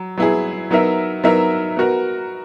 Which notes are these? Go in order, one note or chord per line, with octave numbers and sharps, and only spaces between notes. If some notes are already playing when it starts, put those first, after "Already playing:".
Already playing: F#3
F#3 B3 E4 G#4
F#3 B3 D#4 A#4 E5
F#3 B3 D#4 A#4 E5
B3 F#4 A#4